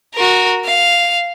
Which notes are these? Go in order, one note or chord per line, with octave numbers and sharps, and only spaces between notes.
F#4 A#4
F5